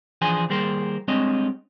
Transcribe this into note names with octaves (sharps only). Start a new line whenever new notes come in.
E3 F3 D4 G#4 C5 G#5
D#3 G3 A#3 G#4 A#4 C5
G3 G#3 C4 D4 C#5 D#5